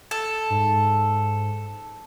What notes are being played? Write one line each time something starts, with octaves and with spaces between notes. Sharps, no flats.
A4
G#2